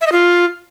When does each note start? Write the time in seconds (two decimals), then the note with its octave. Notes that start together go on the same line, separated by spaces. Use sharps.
0.01 E5
0.07 D#5
0.12 F4